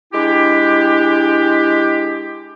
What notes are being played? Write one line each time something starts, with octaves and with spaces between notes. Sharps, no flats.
G#3 D4 E4 G4